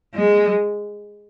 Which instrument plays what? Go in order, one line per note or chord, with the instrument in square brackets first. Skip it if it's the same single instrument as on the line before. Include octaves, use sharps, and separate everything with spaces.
[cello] G#3